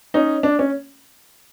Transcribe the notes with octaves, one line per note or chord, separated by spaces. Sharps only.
C#4 D#4
D4
C#4